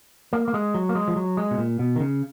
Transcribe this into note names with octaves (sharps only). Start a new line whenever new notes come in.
A#3
A#3
G#3
F#3
A#3
G#3
F3
F#3
G#3
B2
A#2
B2
D#3
C#3